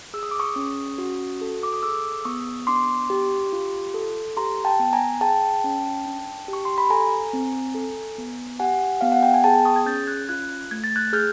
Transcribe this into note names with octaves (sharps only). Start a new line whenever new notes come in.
G#4 E6
D#6
D6
C#6 D#6
C#4
F#4
A4
D6
D#6
G#4 D6 E6
E6
B3 C#6 D#6
D4 C6 D6
G4
F4
A4
G4 A#5 C6
G5 A5
B3
G#5 A#5
G#4 G5 A5
C#4
D4
G4
C#6
C6
B5
A4 G#5 A#5
C4
A4
B3
G4 F#5 G#5
B3 F5
F#5
G5
G#5
G#4 G5 A5
C#6 D#6
G#6
C#4 G6 A6
F#6 G#6
F4 F#6 G#6
A3 G#6
A6
F#6 G#6
G#4 F6 G6